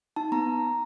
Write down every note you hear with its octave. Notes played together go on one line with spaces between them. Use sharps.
D#4 A5
B3 A#5